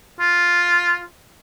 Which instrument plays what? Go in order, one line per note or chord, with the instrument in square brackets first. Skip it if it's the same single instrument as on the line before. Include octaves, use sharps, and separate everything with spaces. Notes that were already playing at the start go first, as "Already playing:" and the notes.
[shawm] F4